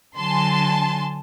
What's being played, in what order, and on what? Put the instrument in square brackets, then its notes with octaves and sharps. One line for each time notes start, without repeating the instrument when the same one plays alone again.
[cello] D3 F#3 [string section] G#5 A5 C6